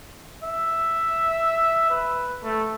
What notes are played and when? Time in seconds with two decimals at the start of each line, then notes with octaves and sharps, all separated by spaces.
0.44 E5
1.90 B4
2.44 A3